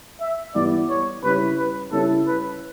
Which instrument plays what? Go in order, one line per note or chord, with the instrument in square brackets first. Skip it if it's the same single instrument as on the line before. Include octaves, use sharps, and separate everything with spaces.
[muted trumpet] E5
[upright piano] E3 G3 B3 E4 [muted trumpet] D5
[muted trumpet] C#5
[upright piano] C#3 G3 C#4 E4 [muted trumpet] B4
[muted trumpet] B4
[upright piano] C#3 G3 C#4 E4 [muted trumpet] A4
[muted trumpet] B4